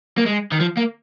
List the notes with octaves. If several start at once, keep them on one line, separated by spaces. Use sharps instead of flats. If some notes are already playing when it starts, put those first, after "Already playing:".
A#3
G#3
D#3
F3
A#3